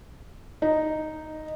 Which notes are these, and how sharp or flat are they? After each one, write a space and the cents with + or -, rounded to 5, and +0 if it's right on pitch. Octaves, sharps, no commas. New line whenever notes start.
D#4 -5